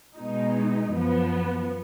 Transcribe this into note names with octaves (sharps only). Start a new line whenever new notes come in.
B2 G#3 D#4
F#2 F3 B3